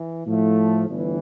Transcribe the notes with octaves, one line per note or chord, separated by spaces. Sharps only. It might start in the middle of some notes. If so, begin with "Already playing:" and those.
Already playing: E3
A2 F3 A3
G1 G2 E3